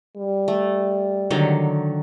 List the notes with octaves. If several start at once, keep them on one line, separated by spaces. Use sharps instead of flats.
G3
A3
D3 D#3 F#3